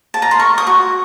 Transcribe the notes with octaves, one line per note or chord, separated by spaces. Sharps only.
A5
A#5
C6
A#4 C#6
D#6
F#4 C#6